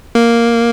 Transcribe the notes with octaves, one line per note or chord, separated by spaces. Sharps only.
A#3